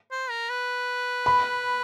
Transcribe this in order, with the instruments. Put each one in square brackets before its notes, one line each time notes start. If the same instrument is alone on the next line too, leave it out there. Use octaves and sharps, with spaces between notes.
[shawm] C5
A#4
B4
[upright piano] B5